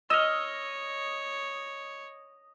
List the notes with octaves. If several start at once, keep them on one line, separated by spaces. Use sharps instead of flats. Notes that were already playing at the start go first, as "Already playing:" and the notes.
C#5 D#5 E6 F6